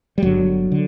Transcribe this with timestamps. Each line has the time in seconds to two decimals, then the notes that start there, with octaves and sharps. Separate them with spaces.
0.18 G3
0.22 G1 G2 D3 F#3
0.72 D3